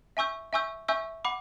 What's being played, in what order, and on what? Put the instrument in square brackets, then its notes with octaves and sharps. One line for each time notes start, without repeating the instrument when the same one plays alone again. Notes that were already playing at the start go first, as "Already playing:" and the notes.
[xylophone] E5 G#5 C#6 E6 G6
E5 G#5 C#6 E6 G6
E5 G#5 C#6 E6 G6
F#5 B5 D6